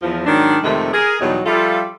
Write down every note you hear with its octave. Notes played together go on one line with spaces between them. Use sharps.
E2 F3
G#2 D#3 F#3 D4
F2 C3 D#3 G#3 A3
G#4 A#4
E2 B2 F#3 G3 D#4
F3 G3 F4 A4 E5 F5